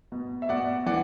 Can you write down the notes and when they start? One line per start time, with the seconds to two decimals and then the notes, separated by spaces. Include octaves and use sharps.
0.12 B2
0.42 E5
0.49 B2 D5 F#5
0.86 E3 D5 F#5